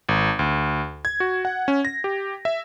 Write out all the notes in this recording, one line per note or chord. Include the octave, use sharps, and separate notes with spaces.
G#1
D2
G#6
F#4
F#5
C#4
A#6
G4
E5